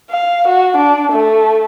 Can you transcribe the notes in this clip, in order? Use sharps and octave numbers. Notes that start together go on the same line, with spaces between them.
F5
F#4
D4
A3